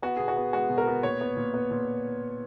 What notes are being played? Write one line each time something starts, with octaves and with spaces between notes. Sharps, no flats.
B3 F#4
B2 G#4
F#4
B3
G#3 F#4
B2
A#4
B3
A#2 C#5
B3
A#2
B3
A#2